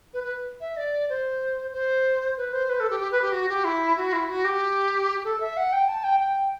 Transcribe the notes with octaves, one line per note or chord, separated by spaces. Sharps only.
B4
B4
E5
D5
C5
C5
B4
C5
B4
A4
G4
G4
B4
G4
F#4
G4
E4
F#4
E4
F#4
G4
A4
E5
F#5
G5
A5
G5
G5